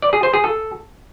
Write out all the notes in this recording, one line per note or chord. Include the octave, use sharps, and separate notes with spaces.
D5
G#4
C5
G#4
A4